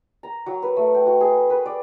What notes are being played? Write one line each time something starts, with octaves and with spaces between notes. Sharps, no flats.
A#5
F#3
B4
A3
G5
F#4
G#4
B4
D5